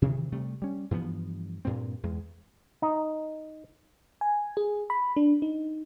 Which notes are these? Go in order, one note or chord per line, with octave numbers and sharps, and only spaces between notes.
C3 D#3 E3
C3 G3 A3
G3 C#4
G2 E3 F3 B3
G2 A#2 A#3 C4
E2 G#3
D#4
G#5
G#4
B5
D4
D#4